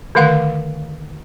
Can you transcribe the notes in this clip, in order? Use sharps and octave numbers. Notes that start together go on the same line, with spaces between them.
D3 D#3 A3 F5 F#5